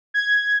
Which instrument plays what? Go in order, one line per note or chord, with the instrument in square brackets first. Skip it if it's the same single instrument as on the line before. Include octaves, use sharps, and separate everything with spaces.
[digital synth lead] G#6